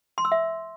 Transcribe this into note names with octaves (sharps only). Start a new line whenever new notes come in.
C6
E6
E5